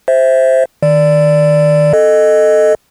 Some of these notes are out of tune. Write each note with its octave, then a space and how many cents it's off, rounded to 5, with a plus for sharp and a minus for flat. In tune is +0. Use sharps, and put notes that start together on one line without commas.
C5 +0 E5 +0
D#3 +0 D5 +0
A4 +0 D#5 -10